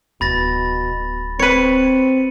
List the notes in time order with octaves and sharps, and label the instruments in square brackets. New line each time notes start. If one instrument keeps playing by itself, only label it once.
[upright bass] D1 [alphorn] B2 [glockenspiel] B5 A6 A#6
[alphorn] C4 [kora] B4 C#5 [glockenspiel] C#7 D#7